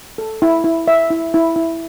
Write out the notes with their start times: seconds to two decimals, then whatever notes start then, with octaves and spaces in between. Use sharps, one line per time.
0.18 A4
0.42 E4
0.64 E4
0.88 E5
1.10 E4
1.34 E4
1.56 E4